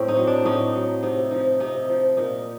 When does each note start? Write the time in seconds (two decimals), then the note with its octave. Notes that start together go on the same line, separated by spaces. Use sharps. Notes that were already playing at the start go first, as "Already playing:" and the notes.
Already playing: A2 C4
0.08 D#4
0.17 F#3
0.27 D4
0.45 A2 D#4
0.75 F#3
1.02 C3 D#4
1.31 F3 D#4
1.60 C3 D#4
1.89 F3
2.17 A#2 D#4